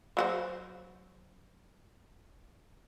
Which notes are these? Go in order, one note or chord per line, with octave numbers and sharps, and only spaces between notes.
F#3 F#4 C5